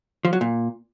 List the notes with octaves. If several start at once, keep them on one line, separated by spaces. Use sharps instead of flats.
F3
F#3
A#2